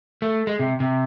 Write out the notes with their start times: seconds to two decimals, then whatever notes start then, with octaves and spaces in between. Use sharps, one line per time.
0.22 A3
0.47 G#3
0.59 C3
0.80 C3